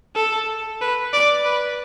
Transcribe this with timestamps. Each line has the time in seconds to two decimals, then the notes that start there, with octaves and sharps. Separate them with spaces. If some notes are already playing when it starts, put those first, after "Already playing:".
0.15 A4
0.81 B4
1.13 D5
1.45 B4